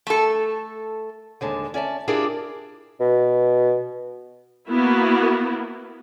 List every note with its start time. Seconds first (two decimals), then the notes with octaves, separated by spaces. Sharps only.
0.07 A3 A4
1.41 D#2 D3 G#3 A5
1.74 C#4 D5 E5 A5
2.08 D4 E4 F4 G4 G#4 A#4
3.00 B2
4.69 A#3 B3 E4 F#4